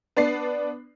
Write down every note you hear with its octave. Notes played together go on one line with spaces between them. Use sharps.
B3 D4 D5 C7